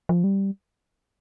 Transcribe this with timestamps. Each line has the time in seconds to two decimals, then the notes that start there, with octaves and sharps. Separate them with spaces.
0.09 F3
0.24 G3